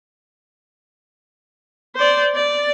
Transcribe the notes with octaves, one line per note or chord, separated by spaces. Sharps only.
C5 D5
D5